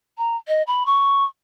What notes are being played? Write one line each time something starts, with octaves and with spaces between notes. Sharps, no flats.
A#5
D#5
B5
C#6